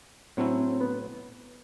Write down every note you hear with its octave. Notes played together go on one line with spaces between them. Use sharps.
A2 F#3 A3 C4 C#4 E4
C4
B3